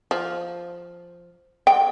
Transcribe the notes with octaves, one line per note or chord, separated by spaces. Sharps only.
F3
G5